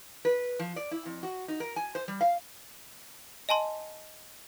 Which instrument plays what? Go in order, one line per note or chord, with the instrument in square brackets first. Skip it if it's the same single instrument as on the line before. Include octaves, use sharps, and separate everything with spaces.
[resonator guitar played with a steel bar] B4
F3
D5
E4
F2
F#4
D#4
A#4
G#5
C5
G3
F5
[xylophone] D#5 G#5 A5 C6